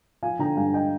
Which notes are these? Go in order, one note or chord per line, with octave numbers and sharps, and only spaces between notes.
F3 F5 G#5
D3 G5 A#5
G2 F5 G#5
D#5 G5